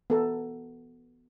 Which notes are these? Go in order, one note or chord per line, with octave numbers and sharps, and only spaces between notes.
B3 A4 A#5